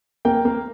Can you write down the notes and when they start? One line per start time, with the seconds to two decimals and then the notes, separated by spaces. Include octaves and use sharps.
0.25 A#3 G5
0.45 A#3